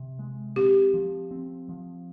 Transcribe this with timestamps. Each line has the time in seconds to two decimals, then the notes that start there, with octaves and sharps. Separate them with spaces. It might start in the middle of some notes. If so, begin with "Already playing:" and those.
Already playing: C3
0.19 G#3
0.56 C4 G4
0.94 F3
1.31 C4
1.69 F3